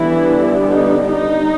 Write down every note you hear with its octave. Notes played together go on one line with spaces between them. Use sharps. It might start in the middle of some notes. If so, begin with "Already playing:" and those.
Already playing: D3 E3 G3 B3 D4 E4
D#4
D#4